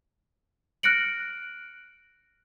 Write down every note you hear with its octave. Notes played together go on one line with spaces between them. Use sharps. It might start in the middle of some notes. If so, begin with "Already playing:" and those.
F6 F#6 A#6 C#7 D7 F#7